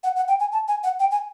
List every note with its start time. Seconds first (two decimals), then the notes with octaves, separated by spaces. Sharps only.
0.04 F#5
0.16 F#5
0.28 G5
0.40 G#5
0.52 A5
0.68 G#5
0.83 F#5
1.00 G5
1.11 G#5